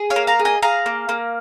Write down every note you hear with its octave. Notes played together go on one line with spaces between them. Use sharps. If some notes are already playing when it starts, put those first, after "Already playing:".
Already playing: G#4
C#5 F5
A#3
F5 A#5
G#4
D#5 G#5
G#4 F5 A#5
A#3
A#3